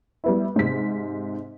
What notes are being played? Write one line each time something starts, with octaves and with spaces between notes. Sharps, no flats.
G3 B3 E4
G#2 C3 B6